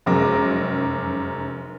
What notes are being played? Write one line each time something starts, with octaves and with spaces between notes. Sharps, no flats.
F1 F#2 G#3 A#4 D6 A#6